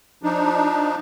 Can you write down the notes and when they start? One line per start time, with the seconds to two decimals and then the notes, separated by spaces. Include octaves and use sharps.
0.23 F3 D4 D#4